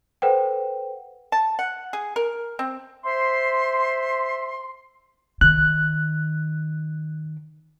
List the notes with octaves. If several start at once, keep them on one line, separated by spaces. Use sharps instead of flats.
A4 B4 C5 F#5 G5
A5
F#5
G#4
A#4
C4
C5 E5 C6
D#3 F#6